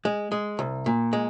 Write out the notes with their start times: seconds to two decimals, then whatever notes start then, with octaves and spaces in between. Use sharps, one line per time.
0.05 G#3
0.32 G#3
0.59 C2
0.86 A#2
1.13 G#3